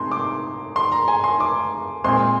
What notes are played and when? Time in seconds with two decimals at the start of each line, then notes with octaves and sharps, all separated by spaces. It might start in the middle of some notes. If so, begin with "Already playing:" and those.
Already playing: C3 G#3 D#4 C6
0.12 D6
0.76 C6
0.92 A#5
1.08 G#5
1.24 C6
1.40 D6
2.04 A#2 G#3 C4 C6